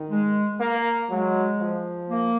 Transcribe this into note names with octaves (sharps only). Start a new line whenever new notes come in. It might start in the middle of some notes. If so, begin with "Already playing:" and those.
Already playing: D#3
G#3
A#3
F#3 G#3
F3
A#3